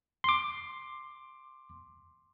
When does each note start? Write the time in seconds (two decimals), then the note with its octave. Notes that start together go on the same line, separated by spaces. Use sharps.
0.24 C6 D6